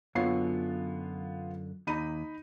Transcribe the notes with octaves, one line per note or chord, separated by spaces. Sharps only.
F#2 D3 B3 F4 C#5 C7
D#2 D#4 A#5 B5 D#7